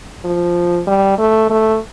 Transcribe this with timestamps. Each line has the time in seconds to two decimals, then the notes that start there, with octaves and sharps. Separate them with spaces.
0.25 F3
0.87 G3
1.18 A3
1.50 A3